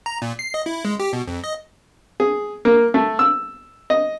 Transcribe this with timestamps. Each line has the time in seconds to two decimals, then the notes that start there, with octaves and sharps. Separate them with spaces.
0.06 A#5
0.22 A#2
0.39 C7
0.54 D#5
0.66 E4
0.85 G#3
1.00 G4
1.13 B2
1.28 F2
1.44 D#5
2.20 G#4
2.65 A#3
2.94 A3
3.19 E6
3.90 D#5